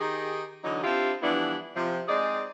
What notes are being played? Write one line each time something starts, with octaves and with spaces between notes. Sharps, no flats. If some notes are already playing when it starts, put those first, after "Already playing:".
D#3 D#4 G4 G#4
D3 E3 F#3 D#4
C4 D4 E4 F4 G4
E3 F3 G3 B3 D4 E4
C3 F3
G#3 C4 D#4 G#4 D5